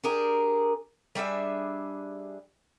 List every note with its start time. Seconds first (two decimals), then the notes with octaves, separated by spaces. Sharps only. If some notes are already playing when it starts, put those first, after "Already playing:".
0.04 D4 G4 G#4 A#4
1.15 G3 D4 G#4 E5